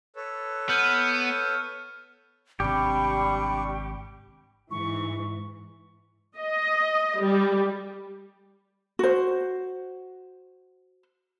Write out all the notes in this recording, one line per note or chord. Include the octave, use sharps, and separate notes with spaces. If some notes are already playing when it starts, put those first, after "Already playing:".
A4 B4 C#5
B3 F6 G6 D#7
G#1 C3 G3 D4 G4 B5 C#6
G#2 E3 C#6
D#5
G3
F#4 C5